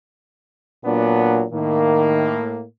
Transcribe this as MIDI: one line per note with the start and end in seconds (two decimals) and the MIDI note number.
0.85 1.45 46
0.85 1.44 54
0.85 1.44 59
0.85 1.44 62
1.52 2.64 45
1.52 2.36 51
1.52 2.64 58